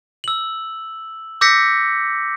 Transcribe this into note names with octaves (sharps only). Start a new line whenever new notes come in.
E6 F#7
D6 E6 G6 A#6 B6 C#7